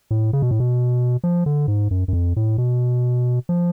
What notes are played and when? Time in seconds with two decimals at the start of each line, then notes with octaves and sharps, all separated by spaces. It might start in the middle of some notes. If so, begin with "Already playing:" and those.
0.11 A2
0.33 C#3
0.42 B2
0.51 A2
0.60 B2
1.24 F3
1.46 D3
1.68 G#2
1.91 F#2
2.08 F#2
2.13 F2
2.36 A2
2.58 B2
3.49 F3